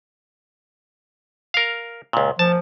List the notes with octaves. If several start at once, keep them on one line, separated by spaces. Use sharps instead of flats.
A#4 F5
C#2 A#2
F3 A5